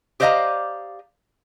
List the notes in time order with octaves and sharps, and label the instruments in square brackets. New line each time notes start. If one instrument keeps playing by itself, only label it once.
[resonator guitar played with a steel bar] G4 C5 D5 D#5 F5 A#5